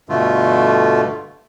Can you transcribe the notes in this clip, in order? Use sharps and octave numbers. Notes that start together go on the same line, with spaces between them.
G2 B2 D3 A3 F4